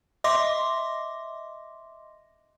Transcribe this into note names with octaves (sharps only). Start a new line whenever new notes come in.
D#5 E5 C6 D6 A#6